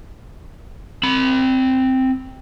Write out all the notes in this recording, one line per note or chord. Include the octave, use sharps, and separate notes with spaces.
C4 B5